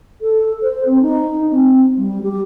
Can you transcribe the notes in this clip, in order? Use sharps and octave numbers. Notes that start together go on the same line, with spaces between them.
A4
C5
C4
D#4
C4
G3
G4